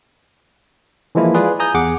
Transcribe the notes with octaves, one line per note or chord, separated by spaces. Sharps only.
E3 F3 G#3 A#3 E4
F4 G#4 B4 D5
G#5 A#5 D#6 G6
E2 G#4 F#5 D6